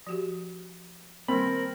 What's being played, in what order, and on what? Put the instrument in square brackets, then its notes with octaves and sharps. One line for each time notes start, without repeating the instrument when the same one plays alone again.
[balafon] F3 F#4 G4
[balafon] D#3 G3 A#3 [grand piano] C4 [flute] A#4 [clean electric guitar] B5